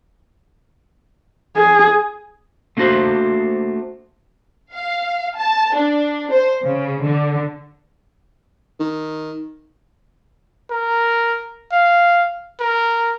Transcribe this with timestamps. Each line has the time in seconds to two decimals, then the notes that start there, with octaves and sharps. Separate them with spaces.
1.56 G#4
2.77 A3 A#3 D4 F#4 C5
4.72 F5
5.36 A5
5.74 D4
6.31 C5
6.62 C#3
7.03 D3
8.79 D#3
10.71 A#4
11.72 F5
12.60 A#4